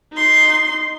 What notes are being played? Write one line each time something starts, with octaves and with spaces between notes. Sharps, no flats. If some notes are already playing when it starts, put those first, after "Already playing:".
D#4 C6